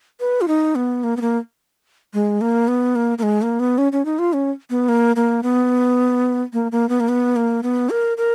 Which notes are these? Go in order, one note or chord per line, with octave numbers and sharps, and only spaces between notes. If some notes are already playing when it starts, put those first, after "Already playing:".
B4
F4
D#4
B3
A#3
B3
A#3
G#3
A#3
B3
A#3
A#3
G#3
A#3
B3
C#4
C#4
D#4
F4
C#4
B3
A#3
A#3
B3
A#3
A#3
B3
A#3
B3
A#3
B3
A#4
A#4